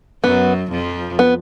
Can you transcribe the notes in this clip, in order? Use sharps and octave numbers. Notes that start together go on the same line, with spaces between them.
F#2 F#3 B3
F2 F3
B3